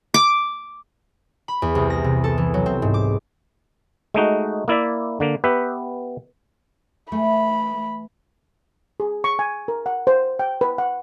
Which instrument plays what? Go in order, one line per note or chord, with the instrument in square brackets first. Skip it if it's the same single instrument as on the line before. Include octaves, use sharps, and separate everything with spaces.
[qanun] D6
[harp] B5
E2
C2
A#6
C3
A4
E3
F#3
C4
G#2
D6
[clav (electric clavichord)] G#3 A3 D#4 F#4
A#3 E4 D5 E5
D3 A#3
B3 G4 B4 E5
[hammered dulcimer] E3 [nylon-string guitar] A3 [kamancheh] B5
[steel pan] G#4
C#6
G#5
A#4
F#5
C5
G5
B4
F#5